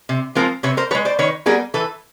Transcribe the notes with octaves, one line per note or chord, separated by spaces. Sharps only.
C3
F3 G#3 C4 A#4 C5
C3 B4 C#5
A#4 C5
F3 B4 C#5
G#3
C5 D5
D#3 B4 C#5
G3 B3 G#4 A#4
E3 A4 B4